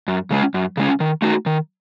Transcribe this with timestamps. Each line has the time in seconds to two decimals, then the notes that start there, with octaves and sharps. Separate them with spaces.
0.08 F#2
0.30 C#3 G#3 C#4
0.54 F#2
0.77 C#3 G#3 C#4
1.00 D#3
1.22 A3 D#4 F#4
1.46 D#3